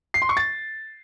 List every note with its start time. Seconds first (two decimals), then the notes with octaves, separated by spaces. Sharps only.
0.14 C7
0.22 C6
0.29 C#6
0.37 A6